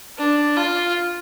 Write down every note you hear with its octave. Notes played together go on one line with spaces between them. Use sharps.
D4
F4